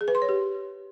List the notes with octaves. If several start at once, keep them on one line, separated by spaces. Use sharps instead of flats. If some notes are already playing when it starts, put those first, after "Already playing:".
G#4
B4
C6
C#5
G4